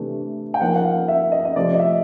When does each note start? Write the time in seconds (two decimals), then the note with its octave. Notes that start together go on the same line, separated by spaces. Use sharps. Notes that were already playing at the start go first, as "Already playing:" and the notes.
Already playing: C3 E3 A3 D4
0.54 G5
0.61 F3 A#3 D#4 F#5
0.76 F#5
0.84 F5
1.08 E5
1.32 D#5
1.45 D#5
1.56 C3 F3 A3 D5
1.74 D#5
1.79 E5